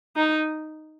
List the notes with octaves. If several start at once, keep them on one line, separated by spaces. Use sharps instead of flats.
D#4